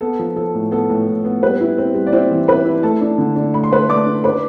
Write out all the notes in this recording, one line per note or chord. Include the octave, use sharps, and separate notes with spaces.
B3 A4
F3
F3 A4
A2
B3 A4
A2
A2
B3
G3 B3 B4
E4
C4
G3
D5
C4 E4 C5
E3
E4 B4 B5
E4
A3 A4 A5
D4
D3
D4
A3 B5
C6
A3 B4 B5
A3 D5 D6
D4
B4 B5